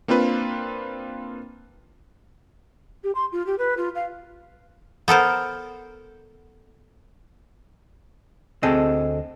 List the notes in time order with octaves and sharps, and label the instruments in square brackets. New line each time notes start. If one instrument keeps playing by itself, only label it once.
[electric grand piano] A#3 C4 D4 F4 B4
[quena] G4
C6
F4
G4
B4
F4
F5
[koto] B3 A4 A#4 C5
[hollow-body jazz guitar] D2 C4 G#4 A4 D#5